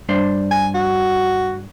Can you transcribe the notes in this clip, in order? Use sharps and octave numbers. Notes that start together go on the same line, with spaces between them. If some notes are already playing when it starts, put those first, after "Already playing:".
G2 D4 C5
G#5
F#4